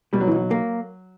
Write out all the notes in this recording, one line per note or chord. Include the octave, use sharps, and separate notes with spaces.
B2 G3
F#3
E3
B1 F#3
A#3